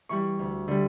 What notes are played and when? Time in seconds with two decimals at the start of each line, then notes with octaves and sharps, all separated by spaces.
0.09 E3 G3 C#6
0.39 D2
0.68 D3 G3